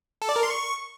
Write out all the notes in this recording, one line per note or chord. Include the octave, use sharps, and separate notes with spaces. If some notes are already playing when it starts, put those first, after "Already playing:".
A4
D5
A#4
C6
C#6